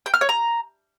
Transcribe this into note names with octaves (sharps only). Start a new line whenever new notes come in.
G5
F6
C#5
A#5